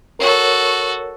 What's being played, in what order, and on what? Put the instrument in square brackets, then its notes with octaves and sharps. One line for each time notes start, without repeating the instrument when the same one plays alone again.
[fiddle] F#4 A4 [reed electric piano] A#4 C#5